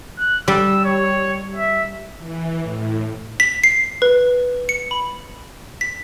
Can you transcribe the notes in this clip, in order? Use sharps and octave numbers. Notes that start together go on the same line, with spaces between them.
F#6
G3 E6
C#5
E5
E3
A2
B6
C7
B4
C#7
B5
B6